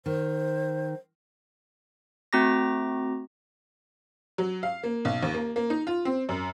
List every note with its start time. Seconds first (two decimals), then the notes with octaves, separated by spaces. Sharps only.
0.06 D#3 C5
2.33 A3 C4 F#4 A#5 D6 A#6
4.38 F#3
4.63 F5
4.84 A#3
5.05 B1
5.23 D#2
5.34 A#3
5.56 A#3
5.70 D#4
5.87 F4
6.05 C4
6.29 F#2